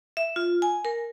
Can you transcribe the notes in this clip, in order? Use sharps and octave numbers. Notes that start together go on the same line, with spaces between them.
E5
F4
G#5
A#4